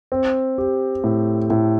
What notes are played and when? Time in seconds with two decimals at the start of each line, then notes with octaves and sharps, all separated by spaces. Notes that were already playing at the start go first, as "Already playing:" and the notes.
0.12 C4
0.58 G4
1.04 A2
1.50 A2